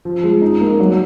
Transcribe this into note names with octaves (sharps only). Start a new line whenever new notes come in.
F3
G#3
D#4
A#3
F#3